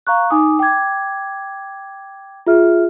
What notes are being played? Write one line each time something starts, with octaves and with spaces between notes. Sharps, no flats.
F5 A#5 C#6 F#6
D#4 G#5 D6 D#6
G5 D6 G#6
F4 G#4 E5 F6